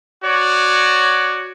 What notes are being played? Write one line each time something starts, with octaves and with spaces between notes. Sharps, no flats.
F#4 C#5 D5